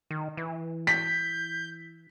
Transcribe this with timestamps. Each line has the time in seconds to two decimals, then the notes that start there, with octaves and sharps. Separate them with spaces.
0.11 D#3
0.37 E3
0.87 G6 B6